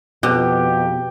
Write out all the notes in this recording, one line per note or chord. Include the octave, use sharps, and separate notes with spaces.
F2 B2 G4